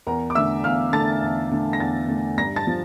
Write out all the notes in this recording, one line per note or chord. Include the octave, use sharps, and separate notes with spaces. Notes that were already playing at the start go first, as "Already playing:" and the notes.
E2 A#4 A#5
D6
D3 A3 E5 E6
E2 F5 F6
D3 A3 A5 A6
E2
D3 A3
A#6
E2 A5 A6
D3 A3
G2 A#5 A#6
A5 A6
F3